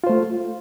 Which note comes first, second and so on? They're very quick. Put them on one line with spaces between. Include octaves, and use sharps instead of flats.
F4 C5 A3